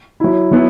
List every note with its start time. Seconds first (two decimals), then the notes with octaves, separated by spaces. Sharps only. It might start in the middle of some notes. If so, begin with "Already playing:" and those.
0.20 F#3 E4
0.51 F#3 B3 E4